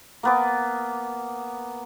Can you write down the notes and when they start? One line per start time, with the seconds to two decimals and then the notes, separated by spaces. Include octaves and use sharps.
0.23 A#3 B3 D6